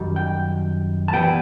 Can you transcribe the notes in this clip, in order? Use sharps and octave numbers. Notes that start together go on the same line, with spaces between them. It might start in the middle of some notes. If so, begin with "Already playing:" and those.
Already playing: F#2 D#3 G3
G5
A5
E3 G3 B3 G5